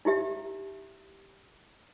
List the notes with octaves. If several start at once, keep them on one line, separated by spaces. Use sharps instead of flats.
D#4 E4 G4 E5